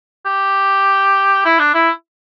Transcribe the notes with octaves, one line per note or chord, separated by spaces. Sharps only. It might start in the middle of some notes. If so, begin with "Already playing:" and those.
G4
E4
D4
E4